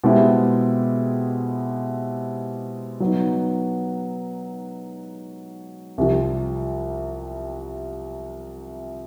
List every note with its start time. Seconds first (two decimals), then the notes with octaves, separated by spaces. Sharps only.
0.04 B2 G#3 C4 E4 G4
3.00 F#3 B3 D#4
5.98 C2 C3 F3